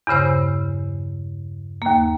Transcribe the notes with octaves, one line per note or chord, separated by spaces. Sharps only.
E2 G2 C#3 C5 E6
D#2 A#3